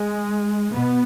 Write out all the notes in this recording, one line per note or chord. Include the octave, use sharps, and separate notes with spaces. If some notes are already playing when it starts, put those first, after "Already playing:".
Already playing: G#3
B2 B3